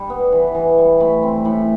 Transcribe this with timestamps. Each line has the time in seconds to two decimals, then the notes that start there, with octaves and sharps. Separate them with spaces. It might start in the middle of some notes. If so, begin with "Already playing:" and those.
Already playing: G3 D4
0.10 B3
0.32 E3
0.55 E3
0.78 G3
1.00 A3 B5
1.22 C4
1.45 A2 B5